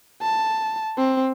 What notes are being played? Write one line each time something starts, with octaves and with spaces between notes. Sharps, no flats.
A5
C4